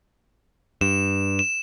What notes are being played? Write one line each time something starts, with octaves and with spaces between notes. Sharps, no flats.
G2 E7
E7